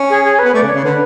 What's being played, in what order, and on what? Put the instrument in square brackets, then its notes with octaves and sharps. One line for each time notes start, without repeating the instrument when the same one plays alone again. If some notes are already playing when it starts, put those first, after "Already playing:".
Already playing: [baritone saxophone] C#4
[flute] G#4
G#4
B4
[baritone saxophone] B3
[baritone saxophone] A3 [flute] D5
[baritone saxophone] C#3
[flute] C#5
[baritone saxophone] C#3
[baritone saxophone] D3 [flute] B4